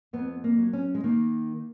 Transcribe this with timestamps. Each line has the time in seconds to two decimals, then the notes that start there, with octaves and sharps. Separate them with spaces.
0.13 F2 B3
0.44 A#3
0.58 F#3
0.73 C#4
0.95 G#3
1.04 D#3 A#3